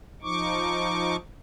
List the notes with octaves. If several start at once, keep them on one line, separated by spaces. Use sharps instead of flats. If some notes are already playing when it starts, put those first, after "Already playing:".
F3 D#4 C#6 D6